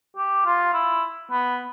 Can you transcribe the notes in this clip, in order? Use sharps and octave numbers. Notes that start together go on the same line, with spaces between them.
G4
F4
E4
B3